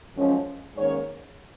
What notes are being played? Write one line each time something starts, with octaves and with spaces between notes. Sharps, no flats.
F#2 F3 G#3 C#4
G#2 D#3 A#3 C#4 C#5